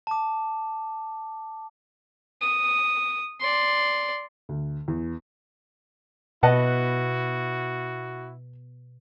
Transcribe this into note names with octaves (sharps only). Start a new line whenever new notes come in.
A5 D6
D#6
D5 C6
D2
E2
B2 E4 F#4 B4 D#5 F#5 A5